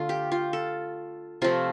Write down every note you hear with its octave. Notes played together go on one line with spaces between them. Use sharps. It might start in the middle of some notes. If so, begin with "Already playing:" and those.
Already playing: D3 A3 F4
G4
F4
A4
C3 F3 A3 F4